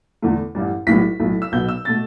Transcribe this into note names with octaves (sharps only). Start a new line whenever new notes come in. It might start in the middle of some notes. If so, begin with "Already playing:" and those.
E2 D3 A3
A1 G2 G3
B1 A2 G3 B3 B6
B1 A2 A3
E6
B1 B2 B3 G6
E6
B2 A3 A6